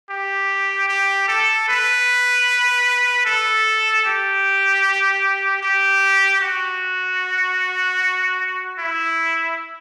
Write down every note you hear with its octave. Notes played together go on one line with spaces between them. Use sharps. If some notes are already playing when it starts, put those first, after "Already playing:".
G4
G4
A4
B4
A4
G4
G4
F#4
E4